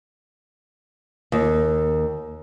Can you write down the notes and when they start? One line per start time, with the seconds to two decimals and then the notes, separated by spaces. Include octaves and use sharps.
1.32 D#2